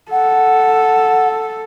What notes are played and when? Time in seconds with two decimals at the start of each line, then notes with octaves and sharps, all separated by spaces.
0.11 A4 F#5